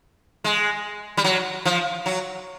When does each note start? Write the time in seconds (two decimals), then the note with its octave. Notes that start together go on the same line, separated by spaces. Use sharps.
0.44 G#3
1.17 G3
1.24 F#3
1.65 F3
2.06 F#3